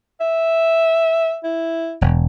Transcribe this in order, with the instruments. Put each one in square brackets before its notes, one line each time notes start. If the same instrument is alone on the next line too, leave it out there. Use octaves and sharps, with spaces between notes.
[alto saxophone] E5
E4
[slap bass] E1